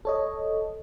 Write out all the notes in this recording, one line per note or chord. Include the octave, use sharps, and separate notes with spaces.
A4 C#5 D#5